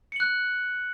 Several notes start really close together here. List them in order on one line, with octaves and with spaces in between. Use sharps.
C#7 F#7 F#6